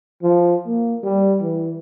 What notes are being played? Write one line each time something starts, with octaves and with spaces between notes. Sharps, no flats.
F3
A#3
G3
E3